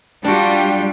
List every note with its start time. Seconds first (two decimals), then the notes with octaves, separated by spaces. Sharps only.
0.24 G3 D4 F4 F#4 G5